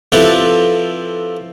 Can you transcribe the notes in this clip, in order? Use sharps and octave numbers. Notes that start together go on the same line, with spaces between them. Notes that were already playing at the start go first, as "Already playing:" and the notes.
F3 C4 E4 G4 A4 B4